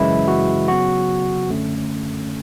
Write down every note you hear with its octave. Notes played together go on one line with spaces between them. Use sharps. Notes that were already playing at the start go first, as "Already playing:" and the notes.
Already playing: F#2 C#3 E3 G#3 E4
F#4
C#3 F#3 B3 F#4
F#2 D3 A3 C#4